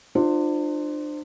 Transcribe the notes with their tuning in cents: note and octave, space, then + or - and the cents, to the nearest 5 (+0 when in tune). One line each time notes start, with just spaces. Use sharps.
D4 +35 F4 +0 C5 +0